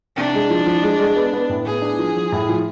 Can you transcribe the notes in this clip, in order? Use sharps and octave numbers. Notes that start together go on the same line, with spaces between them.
C3 D4
G#3
F3
F3
G#3
G#3
B3
B3
A2
B3 G#4
D4
F3
F3
A2
F3